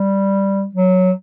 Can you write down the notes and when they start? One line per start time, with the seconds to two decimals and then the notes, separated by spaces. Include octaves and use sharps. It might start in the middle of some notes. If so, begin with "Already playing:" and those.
Already playing: G3
0.75 F#3